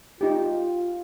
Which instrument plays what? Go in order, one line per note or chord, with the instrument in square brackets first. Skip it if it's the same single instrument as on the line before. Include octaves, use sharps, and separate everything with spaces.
[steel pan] D#4 G4 [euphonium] F4